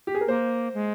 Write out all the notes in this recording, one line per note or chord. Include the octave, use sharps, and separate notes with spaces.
G4
G#4
A#4
A#3 C5
G#3